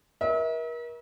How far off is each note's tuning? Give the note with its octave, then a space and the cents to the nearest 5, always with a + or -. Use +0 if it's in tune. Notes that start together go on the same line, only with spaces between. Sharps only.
F#4 +0 A#4 +40 E5 -40